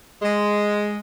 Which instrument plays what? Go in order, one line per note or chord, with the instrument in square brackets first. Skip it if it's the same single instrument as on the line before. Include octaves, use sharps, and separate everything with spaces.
[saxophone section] G#3